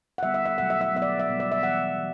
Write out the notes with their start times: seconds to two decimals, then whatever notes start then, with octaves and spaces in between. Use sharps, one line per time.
0.18 F#5
0.22 D3 G3 B3 E5
0.34 E5
0.46 E5
0.58 B2 F#3 A3 F#5
0.70 E5
0.81 E5
0.93 D3 F#3 B3 E5
1.02 D5
1.19 E5
1.29 B2 G3 B3
1.40 D5
1.52 E5
1.63 E3 B3 F#5
1.98 E3